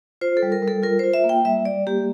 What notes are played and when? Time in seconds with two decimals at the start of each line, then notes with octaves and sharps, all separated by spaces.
0.21 F4 C5
0.37 A4
0.43 G3
0.52 A#4
0.62 G3
0.68 A4
0.83 F4 A#4
0.99 F4 C5
1.14 E5
1.24 A#3
1.29 G5
1.45 G3 E5
1.65 G3 D5
1.87 A#3 G4